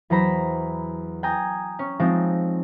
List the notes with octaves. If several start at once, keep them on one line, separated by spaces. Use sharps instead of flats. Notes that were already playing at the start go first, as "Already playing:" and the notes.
E2 F#3 C5 A#5 B5 A#6
G5 G#5 A#5 D#6
C#4
F3 G#3 C4 D#4